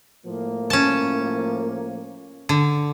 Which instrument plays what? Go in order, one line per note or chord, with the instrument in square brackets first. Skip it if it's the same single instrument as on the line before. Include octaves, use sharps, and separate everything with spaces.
[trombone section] A2 F3 A#3
[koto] C#4 A5
D3